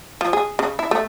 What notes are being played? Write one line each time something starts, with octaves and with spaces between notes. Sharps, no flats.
F3
G#4
C#3
E4
A3